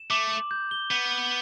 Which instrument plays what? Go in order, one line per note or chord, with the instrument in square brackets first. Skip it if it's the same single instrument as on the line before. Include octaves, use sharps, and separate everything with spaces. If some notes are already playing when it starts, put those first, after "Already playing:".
Already playing: [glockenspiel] E7
[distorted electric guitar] A3 [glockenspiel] D6
[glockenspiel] F#7
G6
G7
[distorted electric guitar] B3 [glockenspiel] G6
[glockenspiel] F#7